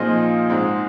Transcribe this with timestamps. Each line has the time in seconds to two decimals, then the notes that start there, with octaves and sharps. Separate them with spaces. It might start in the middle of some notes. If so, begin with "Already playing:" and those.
Already playing: A#2 F3 C4 D#4 G#4 D#5 F5
0.49 G#2 G#3 C4